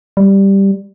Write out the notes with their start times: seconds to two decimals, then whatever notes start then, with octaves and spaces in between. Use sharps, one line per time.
0.17 G3